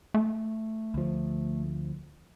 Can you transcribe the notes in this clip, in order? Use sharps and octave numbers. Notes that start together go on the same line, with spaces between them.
A3
D2 F3